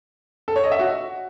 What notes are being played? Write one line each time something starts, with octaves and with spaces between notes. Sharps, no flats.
A4
C#5
D#5
E5
F#4